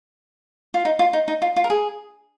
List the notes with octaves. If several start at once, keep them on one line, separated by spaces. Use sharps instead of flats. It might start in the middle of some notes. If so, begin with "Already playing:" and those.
F4
D#4
F4
D#4
D#4
F4
F4
A#4
G#4